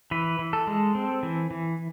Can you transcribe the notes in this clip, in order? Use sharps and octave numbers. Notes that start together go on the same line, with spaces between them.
E3 B4
E3
A4
G#3
C4
E3
E3